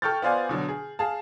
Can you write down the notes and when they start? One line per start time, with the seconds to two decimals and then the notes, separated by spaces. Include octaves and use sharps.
0.02 A4 G5 C#6 F6 G6 A6
0.22 B3 F4 C5 D5 F5 G#5
0.49 B2 D3 F#3
0.69 G#4
0.99 G#4 F5 A5